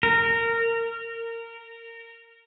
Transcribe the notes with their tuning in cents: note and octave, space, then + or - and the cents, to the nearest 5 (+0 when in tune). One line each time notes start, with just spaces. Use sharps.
A#4 -20